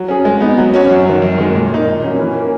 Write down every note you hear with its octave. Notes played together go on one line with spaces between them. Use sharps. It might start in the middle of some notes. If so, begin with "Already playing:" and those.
Already playing: F#3
C#4 G#4
G#3
B3 D#4
F#3
C#4 F#4 C#5
F#2
D#3 F#3
F#2
D#3 G#3
A#2
A#3 D#4
A#2
F#3 A#3 C#4
E3
A#3 C#4